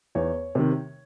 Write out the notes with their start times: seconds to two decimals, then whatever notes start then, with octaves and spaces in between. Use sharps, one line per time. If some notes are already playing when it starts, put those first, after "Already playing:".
0.15 E2 C#5
0.55 C3 D#3